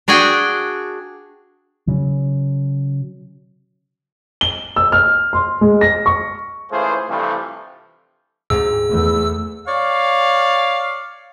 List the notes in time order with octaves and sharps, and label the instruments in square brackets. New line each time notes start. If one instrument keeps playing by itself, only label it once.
[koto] D4 F#4 G#4 G5 G#5
[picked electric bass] C#3 F#3
[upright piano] G7
E6
F6
C6
G#3
A#6
C#6
[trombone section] C#2 E3 A3 F4 G#4 C5
G2 C3 E3 F3 G3 A3
[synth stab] D2 G#2 C3 [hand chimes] G#4 [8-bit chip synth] E6
[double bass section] E2 A3
[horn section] C#5 D5 F5